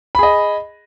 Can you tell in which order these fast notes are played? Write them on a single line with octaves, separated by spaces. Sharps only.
B5 G#4 D#5